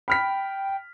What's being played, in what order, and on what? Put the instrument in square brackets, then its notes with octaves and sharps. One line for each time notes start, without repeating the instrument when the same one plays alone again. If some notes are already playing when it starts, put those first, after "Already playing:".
[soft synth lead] G5 [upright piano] B5 F6 B6